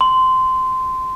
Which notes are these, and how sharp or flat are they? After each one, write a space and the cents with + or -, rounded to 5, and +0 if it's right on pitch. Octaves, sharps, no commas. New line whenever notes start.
C6 -15